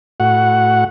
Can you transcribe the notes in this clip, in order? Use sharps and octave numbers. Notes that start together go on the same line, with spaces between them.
A2 F#4 F#5